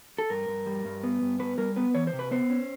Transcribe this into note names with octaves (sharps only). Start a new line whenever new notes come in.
A4
G2 A#4
G2
G3
G2
B3
G2
B3 B4
G3 A#4
B3 B4
E3 C#5
C5
C3
B4
B3 C5
C#4